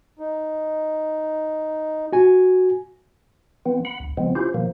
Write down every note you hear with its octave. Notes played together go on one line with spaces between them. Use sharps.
D#4
F#4 G#5
E3 B3 C4
F#5 B5
D2
C#3 F3 G#3 B3 C4
C#4 E4 F4 G4 C5
B2 D#3 F3 A#3